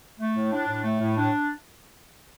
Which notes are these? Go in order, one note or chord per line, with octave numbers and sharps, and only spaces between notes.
A3
A2
D4
A2
A3
A2
D4